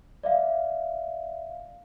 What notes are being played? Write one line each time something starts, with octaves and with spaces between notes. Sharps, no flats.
D5 E5 F5